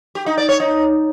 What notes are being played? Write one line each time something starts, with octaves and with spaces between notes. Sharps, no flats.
G4
D#4
D5
C#5
D#4